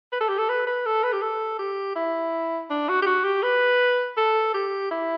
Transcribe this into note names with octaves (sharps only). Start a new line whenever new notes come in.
B4
A4
G4
A4
B4
B4
A4
B4
G4
A4
G4
E4
D4
F#4
G4
F#4
G4
B4
A4
G4
E4